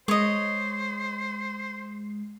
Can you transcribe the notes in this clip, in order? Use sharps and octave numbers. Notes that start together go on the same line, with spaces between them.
G#3 C5 C#5 D#5